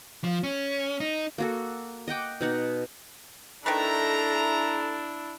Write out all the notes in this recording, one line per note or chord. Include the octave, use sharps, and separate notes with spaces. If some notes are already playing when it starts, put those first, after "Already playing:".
F3
C#4
D#4
A#3 F#4 A4
D#5 F#5 G5 D6
B2 D#4 F#5
D#3 A3 D4 E4 A4 B4 A#5